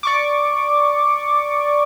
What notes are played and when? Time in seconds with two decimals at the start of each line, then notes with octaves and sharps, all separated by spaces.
0.03 D5 C#6 D6